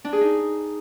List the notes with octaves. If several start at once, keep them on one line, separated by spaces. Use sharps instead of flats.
D4
G#4
D#4